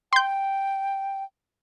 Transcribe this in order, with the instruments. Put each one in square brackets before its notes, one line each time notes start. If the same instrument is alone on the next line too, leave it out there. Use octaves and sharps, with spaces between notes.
[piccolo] G5 [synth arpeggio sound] C6 G6